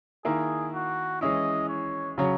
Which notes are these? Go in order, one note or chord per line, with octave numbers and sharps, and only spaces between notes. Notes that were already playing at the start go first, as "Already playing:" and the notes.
D#3 A#3 E4 G#4
F#4
E3 G#3 C#4 E4 D#5
C#5
C#3 F#3 C#4